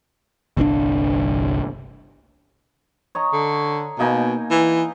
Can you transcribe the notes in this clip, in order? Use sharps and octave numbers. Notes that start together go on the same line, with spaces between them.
G1 C2 C#3 D4
C#5 D#5 A#5
D3
B2 A#3 D#4 G#5
E3